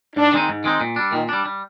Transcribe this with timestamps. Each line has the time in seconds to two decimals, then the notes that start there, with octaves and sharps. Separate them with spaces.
0.16 G#2 D4
0.32 D#3 G#3 C4 D#4
0.49 G#2
0.64 D#3 G#3 C4 D#4
0.81 A#2
0.96 G3 D4
1.12 A#2 D#3
1.29 G3 D4
1.46 G3